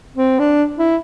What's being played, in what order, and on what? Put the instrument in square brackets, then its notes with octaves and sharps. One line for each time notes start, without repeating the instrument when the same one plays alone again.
[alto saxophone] C4
D4
E4